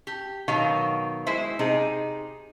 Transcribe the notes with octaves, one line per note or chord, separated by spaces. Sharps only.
G4
B2 D#3 F#3 F5
G#3 E4 C5 E5
C3 D#4 G#4